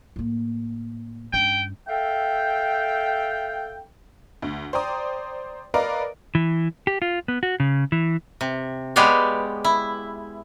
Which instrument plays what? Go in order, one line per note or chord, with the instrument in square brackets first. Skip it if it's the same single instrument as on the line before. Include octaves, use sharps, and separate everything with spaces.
[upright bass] A2 A#3
[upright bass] G2 C#4 [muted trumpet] G5
[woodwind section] A4 E5 F5 G5
[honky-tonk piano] D2
C5 D5 G5 A#5 D#6
A#4 B4 D5 D#5 F5 A#5
[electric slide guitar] E3
G4
F4
B3
F#4
C#3
E3
[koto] C3
G#3 B3 G4 C#5 D5 F5
E4